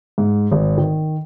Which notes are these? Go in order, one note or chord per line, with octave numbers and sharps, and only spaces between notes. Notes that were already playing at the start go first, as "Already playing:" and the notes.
G#2
G#1
D#3